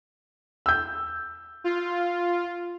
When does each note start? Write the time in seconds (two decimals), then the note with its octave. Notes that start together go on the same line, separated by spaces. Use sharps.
0.66 E6 G6
1.64 F4